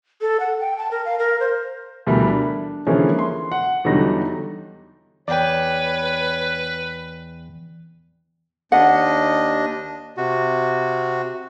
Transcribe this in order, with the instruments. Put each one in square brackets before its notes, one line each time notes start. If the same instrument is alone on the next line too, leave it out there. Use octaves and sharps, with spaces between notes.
[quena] A4
F#5
G5
A5
A#4
F5
A#4
C5
[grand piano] D2 B2 E3 G3 A#4 B5
D4
D3 E3 F3 G#3 A#3 C#4
C6
F#5
E2 D3 F#3 G3 D#4 A#6
[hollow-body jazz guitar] E2 [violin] B4 [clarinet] C#5 [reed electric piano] D5 G5
[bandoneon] D#2 D4 D#5 [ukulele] F#5
[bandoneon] C3 F#4